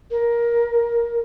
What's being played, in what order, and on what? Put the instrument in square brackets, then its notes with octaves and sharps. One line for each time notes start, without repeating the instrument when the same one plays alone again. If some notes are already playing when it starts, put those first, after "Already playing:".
[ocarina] A#4